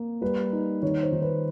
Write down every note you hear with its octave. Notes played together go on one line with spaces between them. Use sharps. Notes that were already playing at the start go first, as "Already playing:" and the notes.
Already playing: A#3
G3 B4
D#4
D#3 C#5
C5
D#3
B4